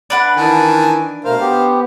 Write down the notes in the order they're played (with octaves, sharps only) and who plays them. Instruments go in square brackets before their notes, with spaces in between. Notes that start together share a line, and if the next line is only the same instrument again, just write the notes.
[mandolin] D4 B4 F#5
[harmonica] D#3 E3 G#5 [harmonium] A5
[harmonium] B2 A3 A#4 [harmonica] C5 F5
[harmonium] B3 G4